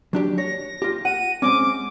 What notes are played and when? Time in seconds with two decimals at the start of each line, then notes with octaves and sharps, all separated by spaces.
0.13 F#3 D4 G4
0.38 C#5 A#6
0.82 F4 G4
1.05 F#5 D#7
1.42 G#3 C4 C#4 D6